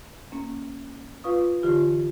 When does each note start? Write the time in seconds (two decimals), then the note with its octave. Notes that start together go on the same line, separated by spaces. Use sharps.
0.32 A#3 C#4
1.24 F4 B4 F5 C#6 D#6
1.63 D3 E3 F4 G4